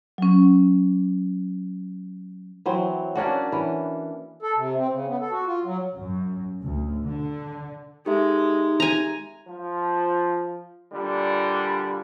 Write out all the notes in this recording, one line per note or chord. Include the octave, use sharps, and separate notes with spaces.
F#3 C#4
E3 F#3 C4
A#3 C#4 D4 F#4
E3
A4
C3
C4
C#3
B3
A4
F#4
F4
F#3
F#2
D2
D3
G#3 D#4 G4 A4 E5
G#5 A#5
F3
A#2 D3 G3